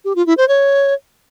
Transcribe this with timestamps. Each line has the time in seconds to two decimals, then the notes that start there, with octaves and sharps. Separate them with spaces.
0.05 G4
0.16 F4
0.27 E4
0.37 C5
0.48 C#5